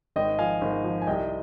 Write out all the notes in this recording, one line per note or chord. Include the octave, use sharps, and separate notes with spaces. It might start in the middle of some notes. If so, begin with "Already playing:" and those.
G#1 D#5 G5
F3 F5 G#5
G#1
F3
G#5
C2 D#5 G5